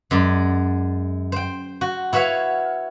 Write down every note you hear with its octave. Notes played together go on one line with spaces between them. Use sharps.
F#2 G#3 D5
C5 G5
F#4
E4 F#4 B4 C#5 F5